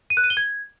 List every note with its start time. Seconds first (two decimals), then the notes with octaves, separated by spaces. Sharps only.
0.10 D#7
0.17 F#6
0.24 D#7
0.30 G7
0.37 G#6